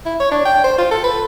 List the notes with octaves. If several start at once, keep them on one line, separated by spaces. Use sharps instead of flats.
E4
C#5
D4
G5
C5
F4
A4
B4